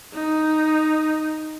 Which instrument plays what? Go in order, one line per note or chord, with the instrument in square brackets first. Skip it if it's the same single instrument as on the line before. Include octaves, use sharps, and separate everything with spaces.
[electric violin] D#4